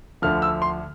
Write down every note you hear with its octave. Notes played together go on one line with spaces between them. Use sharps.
D2 D3 F3 F6
E6
C6